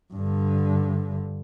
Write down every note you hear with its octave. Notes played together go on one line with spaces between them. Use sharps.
G2 D3